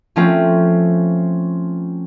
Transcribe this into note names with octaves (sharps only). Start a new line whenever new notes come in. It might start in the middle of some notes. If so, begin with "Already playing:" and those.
F3 A3 C4 C#4 F4